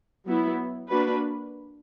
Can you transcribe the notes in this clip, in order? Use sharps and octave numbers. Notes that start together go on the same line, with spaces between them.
F#3 B3 E4
A#3 D4 F#4 B4